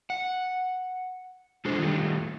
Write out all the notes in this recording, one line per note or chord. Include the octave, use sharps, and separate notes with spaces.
F#5
G#3 D4 F4 G#4 A4 C5
D#3 G3 A3